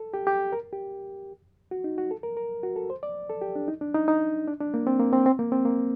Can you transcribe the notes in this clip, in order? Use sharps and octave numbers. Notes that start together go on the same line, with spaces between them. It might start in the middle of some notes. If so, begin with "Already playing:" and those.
Already playing: A4
G4
G4
A#4
G4
F#4
D#4
F#4
A4
A#4
A#4
F#4
A4
C5
D5
A4
G4
D4
D#4
D4
D#4
D#4
D4
D4
A#3
C4
A#3
C4
C4
A#3
C4
A#3